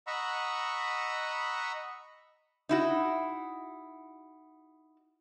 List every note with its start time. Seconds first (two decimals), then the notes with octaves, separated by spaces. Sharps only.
0.07 D#5 F#5 A#5 B5 C#6 E6
2.69 D#4 E4 F#4